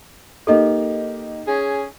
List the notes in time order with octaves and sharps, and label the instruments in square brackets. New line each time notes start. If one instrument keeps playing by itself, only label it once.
[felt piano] A#3 D#4 G4 [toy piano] A4 D#5
[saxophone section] C#4 G#4